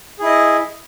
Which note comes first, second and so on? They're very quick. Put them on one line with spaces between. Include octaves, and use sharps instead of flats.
G#4 E4 D#5